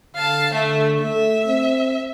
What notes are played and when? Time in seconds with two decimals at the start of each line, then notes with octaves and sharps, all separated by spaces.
0.15 D3 F5 A5
0.54 D3 A3 E5
1.02 A3 E5
1.47 C4